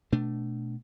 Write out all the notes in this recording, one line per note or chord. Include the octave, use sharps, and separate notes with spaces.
B2 A3 D4